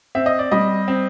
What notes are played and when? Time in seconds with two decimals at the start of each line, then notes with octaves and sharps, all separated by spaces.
0.15 C4 E5
0.26 D#5
0.39 D5
0.52 G3 D#5
0.88 C4